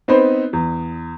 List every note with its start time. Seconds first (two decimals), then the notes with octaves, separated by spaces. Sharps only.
0.08 B3 C4 D#4 B4 C5
0.53 E2